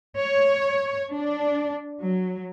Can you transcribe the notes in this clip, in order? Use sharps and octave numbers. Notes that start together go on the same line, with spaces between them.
C#5
D4
F#3